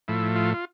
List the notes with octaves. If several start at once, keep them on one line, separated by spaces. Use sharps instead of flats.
A2 F3 A3 E4
F4
F4